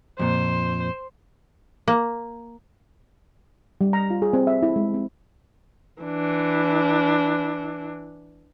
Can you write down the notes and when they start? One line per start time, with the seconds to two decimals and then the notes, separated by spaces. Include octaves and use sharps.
0.19 F2 A#2 C5
1.88 A#3
3.81 G3
3.93 A#5
4.10 F4
4.22 G#4
4.33 C4
4.47 E5
4.63 E4
4.76 G#3
4.94 C4
6.03 E3 D4